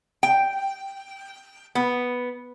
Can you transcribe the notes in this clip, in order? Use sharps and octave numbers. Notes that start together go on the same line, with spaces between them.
G5
B3